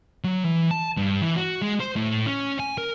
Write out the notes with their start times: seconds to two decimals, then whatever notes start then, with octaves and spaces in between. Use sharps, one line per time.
0.24 F#3
0.45 E3
0.71 A5
0.97 G2
1.22 E3
1.36 F#4
1.62 G#3
1.80 C5
1.96 A2
2.27 C#4
2.60 G#5
2.78 A#4